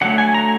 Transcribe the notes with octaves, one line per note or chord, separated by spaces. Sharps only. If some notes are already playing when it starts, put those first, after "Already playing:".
D3 F#3 A3 F#5
G#5
A#5